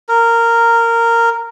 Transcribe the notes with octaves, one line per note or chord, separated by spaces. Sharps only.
A#4